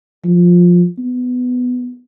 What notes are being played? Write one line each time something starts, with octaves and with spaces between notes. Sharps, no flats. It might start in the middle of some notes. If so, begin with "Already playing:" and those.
F3
B3